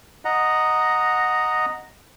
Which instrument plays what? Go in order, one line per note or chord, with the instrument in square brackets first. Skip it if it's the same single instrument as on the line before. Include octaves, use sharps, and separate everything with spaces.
[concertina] D#5 F#5 A#5